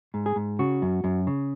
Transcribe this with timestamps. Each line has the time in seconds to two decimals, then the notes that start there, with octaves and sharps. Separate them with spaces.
0.14 G#2
0.26 G#4
0.36 G#2
0.59 C#3 F#4
0.82 F#2
1.04 F#2
1.27 C#3